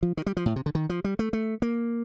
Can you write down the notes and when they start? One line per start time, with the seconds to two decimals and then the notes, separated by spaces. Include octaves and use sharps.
0.03 F3
0.17 D#3
0.26 G3
0.37 F3
0.46 A2
0.56 C3
0.66 D3
0.75 D#3
0.89 F3
1.04 G3
1.19 A3
1.33 A3
1.62 A#3